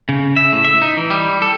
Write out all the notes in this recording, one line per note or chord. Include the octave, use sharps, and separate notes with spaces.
C#3
E5
A2
E5
D#4
E3
G3
A4